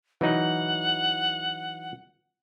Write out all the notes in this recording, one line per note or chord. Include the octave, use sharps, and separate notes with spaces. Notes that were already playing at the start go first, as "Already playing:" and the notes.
E3 F#3 D#4 F#5